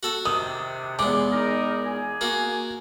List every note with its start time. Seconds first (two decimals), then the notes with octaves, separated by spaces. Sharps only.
0.03 F#4 A4
0.25 C3 D#3 D4 D#6
0.99 E2 G#3 D6
1.33 D#4 A#4
1.85 F4 G#4 G#5
2.21 A#3 F#4